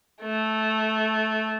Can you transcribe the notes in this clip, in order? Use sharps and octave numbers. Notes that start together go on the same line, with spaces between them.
A3